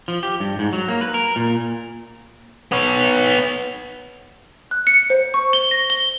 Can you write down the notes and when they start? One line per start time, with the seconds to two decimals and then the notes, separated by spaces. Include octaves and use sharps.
0.08 F3
0.23 G4
0.40 G2
0.59 G#2
0.73 F#3
0.88 A#3
1.01 B4
1.14 A#4
1.36 A#2
2.72 B3 C#5
4.71 F#6
4.87 C#7
5.10 C5
5.34 C#6
5.53 G7
5.71 A#6
5.90 G7